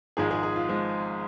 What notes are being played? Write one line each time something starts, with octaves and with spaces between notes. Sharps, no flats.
G#1 G#2 F3 G#3 G#4
G#4
G#4
F4
F3 G#3